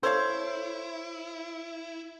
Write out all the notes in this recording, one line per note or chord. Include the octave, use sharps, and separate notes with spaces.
E4 A4 C5 C#5 F5